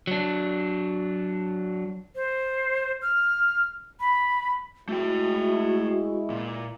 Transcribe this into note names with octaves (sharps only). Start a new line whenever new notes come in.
F#3 D4
C5
F6
B5
G#3 A3 E4 F#4 G5
A#2